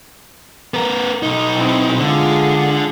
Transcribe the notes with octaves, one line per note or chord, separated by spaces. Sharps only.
B3 A#4
B1 D#4
C4 E4
D3 G#3 F4 G#4